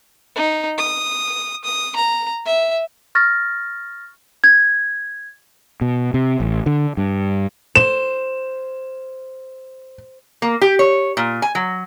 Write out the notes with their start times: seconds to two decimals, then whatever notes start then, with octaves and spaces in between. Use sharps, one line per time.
0.36 D#4
0.78 D#6
1.64 D#6
1.96 A#5
2.46 E5
3.15 C#6 F6 A6 A#6
4.44 G#6
5.81 B2
6.14 C3
6.40 A1
6.66 D3
6.97 G2
7.75 C5 E7
10.42 A#3
10.61 G4
10.79 C#5
11.17 A#2
11.42 G#5
11.55 F#3